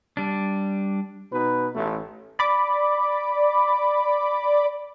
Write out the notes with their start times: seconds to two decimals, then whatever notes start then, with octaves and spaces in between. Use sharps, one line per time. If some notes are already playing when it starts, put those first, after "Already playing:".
0.17 G3 D4
1.33 B2 D#4 B4
1.75 A1 A3
2.39 D5 B5 D6